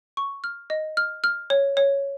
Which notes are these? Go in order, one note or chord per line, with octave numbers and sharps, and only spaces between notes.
C#6
F6
D#5
F6
F6
C#5
C#5